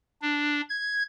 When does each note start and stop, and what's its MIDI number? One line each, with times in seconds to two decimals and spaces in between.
0.22 0.61 62
0.70 1.03 92